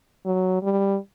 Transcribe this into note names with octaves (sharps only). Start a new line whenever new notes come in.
F#3
G3